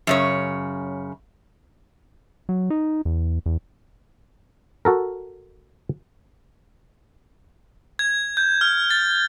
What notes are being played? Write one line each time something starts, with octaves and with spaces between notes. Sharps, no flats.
F#2 C#3 C#5
F#3
D#4
E2
E2
F#4 A4 A#4
G#6
G6
F6
A6